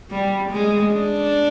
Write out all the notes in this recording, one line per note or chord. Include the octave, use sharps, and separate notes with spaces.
G3
G#3
D4